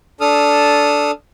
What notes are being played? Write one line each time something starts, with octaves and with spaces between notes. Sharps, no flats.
D4 A4 D#6 F6